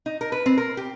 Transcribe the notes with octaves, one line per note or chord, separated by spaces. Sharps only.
D#4
A#4
B4
C4
A#4
G4